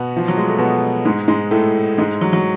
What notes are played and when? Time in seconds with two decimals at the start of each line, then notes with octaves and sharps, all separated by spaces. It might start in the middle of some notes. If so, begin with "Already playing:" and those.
Already playing: B2 B3
0.16 F3
0.28 F#3
0.37 G#3
0.49 A3
0.58 B2 B3
1.05 G#2 G#3
1.28 G#2 G#3
1.51 A2 A3
1.98 G#2 G#3
2.21 F#3
2.33 F#3